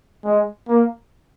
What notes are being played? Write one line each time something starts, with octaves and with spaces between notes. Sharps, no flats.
G#3
A#3